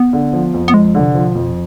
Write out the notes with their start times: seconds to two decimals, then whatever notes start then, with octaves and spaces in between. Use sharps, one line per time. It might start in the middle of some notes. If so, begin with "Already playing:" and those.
Already playing: B3
0.13 D3
0.33 F3
0.54 F2
0.68 B3
0.74 F2 G#3
0.95 D3
1.01 C3
1.15 F3
1.28 B2
1.35 F2